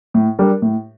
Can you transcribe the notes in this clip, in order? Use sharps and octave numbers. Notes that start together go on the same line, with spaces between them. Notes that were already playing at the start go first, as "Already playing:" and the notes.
A2
G3 D4 G4 A#4
A2